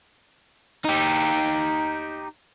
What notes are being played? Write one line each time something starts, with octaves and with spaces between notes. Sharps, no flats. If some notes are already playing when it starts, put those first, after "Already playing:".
D#4 G4